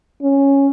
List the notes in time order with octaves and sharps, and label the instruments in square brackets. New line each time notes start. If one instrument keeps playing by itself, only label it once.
[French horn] C#4